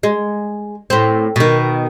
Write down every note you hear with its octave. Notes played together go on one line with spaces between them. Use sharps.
G#3
A2 C4
B2 D#3